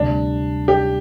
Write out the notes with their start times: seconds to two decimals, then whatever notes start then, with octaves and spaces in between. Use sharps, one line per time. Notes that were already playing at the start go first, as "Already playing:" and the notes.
Already playing: D2 C3 G3 D4
0.68 G4